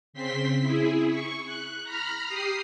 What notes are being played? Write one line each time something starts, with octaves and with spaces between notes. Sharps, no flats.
C#3 C4 C6 B6
E4 G#4
C#6
F#6
A#5 B5 F6
G4 D#6 C7